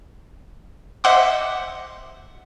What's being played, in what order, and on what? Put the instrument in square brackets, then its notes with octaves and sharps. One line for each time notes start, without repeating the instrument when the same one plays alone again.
[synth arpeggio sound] C5 D#5 E5 F#5 C6 D6